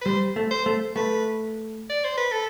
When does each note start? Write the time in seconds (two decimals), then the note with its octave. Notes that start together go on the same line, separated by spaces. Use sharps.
0.01 B4
0.05 G3 C5
0.36 A3
0.51 C5
0.66 A3
0.96 A3 B4
1.90 D5
2.04 C5
2.18 B4
2.32 A4